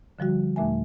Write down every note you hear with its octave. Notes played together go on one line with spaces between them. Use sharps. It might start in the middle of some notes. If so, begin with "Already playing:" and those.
D3 F3 G3 F#4
D#2 A#2 A3 E5 G#5